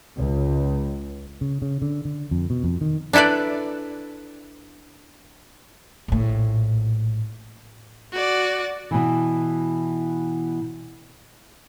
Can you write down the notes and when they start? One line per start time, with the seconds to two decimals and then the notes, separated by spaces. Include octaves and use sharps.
0.17 C#2
1.41 C#3
1.62 C#3
1.82 D3
2.05 D3
2.31 F2
2.50 B2
2.64 F2
2.81 D#3
3.13 D4 E4 A4 B4 D5
6.08 A#1 A2
8.12 F#4 D5
8.91 B2 E3